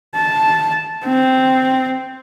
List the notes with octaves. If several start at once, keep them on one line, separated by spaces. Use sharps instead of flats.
A5
C4